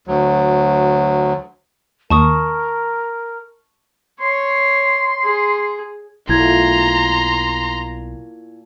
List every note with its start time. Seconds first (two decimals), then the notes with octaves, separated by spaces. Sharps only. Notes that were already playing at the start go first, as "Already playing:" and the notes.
0.08 D2 F#3
2.10 D#2 A#4 A5 C#6 D#6
4.21 C#5 C6
5.23 G#4
6.29 B1 A#2 A3 E4 A#5 C6 G#6